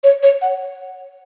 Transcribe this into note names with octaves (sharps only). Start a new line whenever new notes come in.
C#5
C#5
F#5